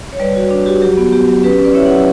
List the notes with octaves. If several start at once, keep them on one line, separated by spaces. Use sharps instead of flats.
C#5
G3 B4 D5
F#4
D4
F#4 G4
F#3 G4
B3
B3 G4
F#3
C#4 G4 B4
C#4
B4 D5
E4 C#5 E5
D5 F#5
F#3